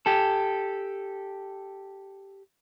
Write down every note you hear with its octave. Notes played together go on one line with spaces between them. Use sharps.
G4 A4